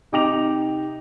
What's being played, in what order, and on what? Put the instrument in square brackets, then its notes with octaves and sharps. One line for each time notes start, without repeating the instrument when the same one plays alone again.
[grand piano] C3 D#4 G5 D6 A#6 F7